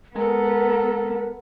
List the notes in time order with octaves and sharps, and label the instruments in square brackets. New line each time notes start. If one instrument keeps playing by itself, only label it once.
[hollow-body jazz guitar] G#3 G#5 [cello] B3 [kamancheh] A4 A#5 [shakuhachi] A#4